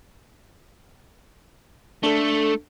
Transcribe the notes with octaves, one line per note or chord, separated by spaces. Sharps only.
A3 D4 A4